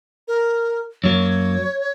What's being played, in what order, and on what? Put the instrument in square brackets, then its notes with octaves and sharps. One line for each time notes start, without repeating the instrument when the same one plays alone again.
[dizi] A#4
[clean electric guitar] F#2 F#3 A#3 [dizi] C#5